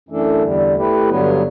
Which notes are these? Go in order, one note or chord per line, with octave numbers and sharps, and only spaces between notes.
F#2 E3 A3 D4 A4
E2 D3 G3
A3 E4 G4 B4
G2 D3 F#3 B3